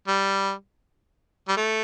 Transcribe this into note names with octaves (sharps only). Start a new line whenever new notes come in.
G3
G3
A3